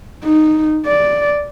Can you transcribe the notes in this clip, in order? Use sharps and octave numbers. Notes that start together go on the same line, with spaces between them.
D#4
D5